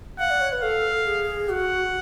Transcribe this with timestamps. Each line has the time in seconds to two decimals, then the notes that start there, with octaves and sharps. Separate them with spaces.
0.19 F5 F#5
0.30 D5
0.41 C#5
0.52 B4
0.63 A4 F5
1.07 G#4
1.49 F#4 F#5